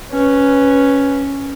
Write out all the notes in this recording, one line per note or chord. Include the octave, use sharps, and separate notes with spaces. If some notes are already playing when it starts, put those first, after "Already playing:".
C#4 B4